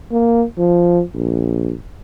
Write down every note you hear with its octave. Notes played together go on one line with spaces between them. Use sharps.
A#3
F3
A#1